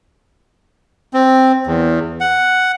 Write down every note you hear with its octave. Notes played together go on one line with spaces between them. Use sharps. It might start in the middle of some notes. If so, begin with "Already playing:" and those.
C4
E2
F#5